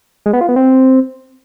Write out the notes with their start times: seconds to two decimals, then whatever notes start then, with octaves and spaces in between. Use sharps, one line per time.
0.26 G#3
0.33 B3
0.41 F4
0.49 B3
0.56 C4